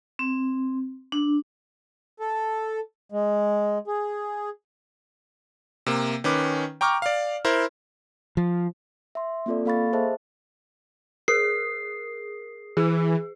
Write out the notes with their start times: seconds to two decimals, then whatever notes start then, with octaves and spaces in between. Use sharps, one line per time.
0.19 C4
1.12 D4
2.20 A4
3.12 G#3
3.88 G#4
5.86 C3 A#3
6.24 D#3 C#4 B4 D6
6.81 G5 A#5 C#6 D6 F6
7.02 D5 F5
7.45 E4 A#4 C5 C6
8.37 F3
9.15 E5 C6
9.46 A#3 C4 F4 A4 D5
9.65 A#3 A4 F5 B5 C#6 A6
9.93 G#4 C5 D#5 E5 A5
11.28 G#4 A#4 D#6 C7
12.77 E3 G#4